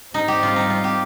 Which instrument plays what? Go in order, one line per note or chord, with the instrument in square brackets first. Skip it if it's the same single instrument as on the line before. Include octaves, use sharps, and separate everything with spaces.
[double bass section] G#2 G3 C4 [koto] D#4
[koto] G4
F4
D#4
F4
G4